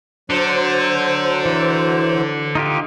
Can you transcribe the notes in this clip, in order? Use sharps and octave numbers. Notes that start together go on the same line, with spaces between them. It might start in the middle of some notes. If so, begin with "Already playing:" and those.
D3 F#3 C5
E3
D#4 F4 G4